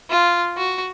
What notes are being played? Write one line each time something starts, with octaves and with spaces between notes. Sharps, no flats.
F4
F#4